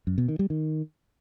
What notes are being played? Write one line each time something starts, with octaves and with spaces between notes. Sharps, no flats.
F#2
B2
D#3
G3
D#3